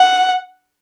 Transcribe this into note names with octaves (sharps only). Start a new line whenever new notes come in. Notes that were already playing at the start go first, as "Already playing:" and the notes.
Already playing: F#5